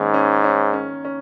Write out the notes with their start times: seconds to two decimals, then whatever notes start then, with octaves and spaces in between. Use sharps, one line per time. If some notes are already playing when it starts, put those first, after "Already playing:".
Already playing: G#2 D#3 A#3 C#4
0.14 C#4
0.44 C#4
0.74 C#4
1.05 C#4